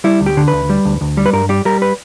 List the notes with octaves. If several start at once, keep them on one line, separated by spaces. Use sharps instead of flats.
G3 E4
D2
G4
D3
B4
D2
G3
D2
D2
G3
B4
G2 A#4
G3 G4
G3 A#4
B4